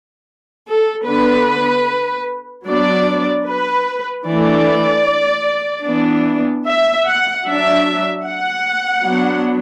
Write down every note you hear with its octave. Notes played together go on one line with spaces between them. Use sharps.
A4
D3 B3 D4 B4
F#3 B3 D4 D5
B4
E3 A3 D4 D5
E3 B3 D4
E5
F#5
F#3 D4 E5
F#5
F#3 B3 D4